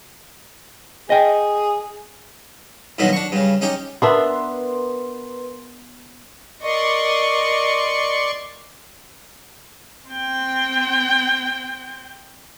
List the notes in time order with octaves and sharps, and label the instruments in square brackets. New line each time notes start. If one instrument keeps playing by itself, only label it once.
[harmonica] G#4 [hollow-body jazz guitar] D#5 G5
[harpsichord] G2 B2 D3 D#3 F#3 D#4
D4 C#6
G2 C#3
C#4 D#4 G4 G5
[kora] B3 D4 E5 [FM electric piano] A#4 B4 C6
[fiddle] A#4 D#5 [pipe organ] D5 C6 C#6
[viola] C4 G5